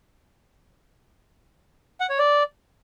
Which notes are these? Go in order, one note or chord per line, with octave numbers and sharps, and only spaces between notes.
F#5
C#5
D5